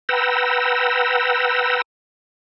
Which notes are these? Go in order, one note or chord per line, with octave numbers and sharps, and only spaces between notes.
B4 F#5 G5 A#5 E6